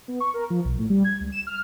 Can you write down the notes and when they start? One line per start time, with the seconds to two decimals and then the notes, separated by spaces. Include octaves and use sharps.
0.08 B3
0.20 C#6
0.34 A#4
0.50 F3
0.65 B1
0.78 A2
0.90 G3
1.04 G#6
1.21 C#2
1.32 E7
1.47 F6